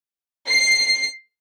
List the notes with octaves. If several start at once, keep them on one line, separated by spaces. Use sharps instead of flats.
C7